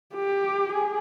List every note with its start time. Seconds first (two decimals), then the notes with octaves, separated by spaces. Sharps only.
0.15 G4
0.69 G#4